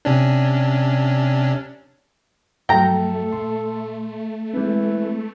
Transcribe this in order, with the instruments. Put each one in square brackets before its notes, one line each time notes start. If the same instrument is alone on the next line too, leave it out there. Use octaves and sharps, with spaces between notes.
[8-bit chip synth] C3 C#4 D4
[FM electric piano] G2 F3 F#3 [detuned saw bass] A3 [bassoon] A4 [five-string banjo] G5 A#5
[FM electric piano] A#2 C6
[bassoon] E3 [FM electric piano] G#3 C4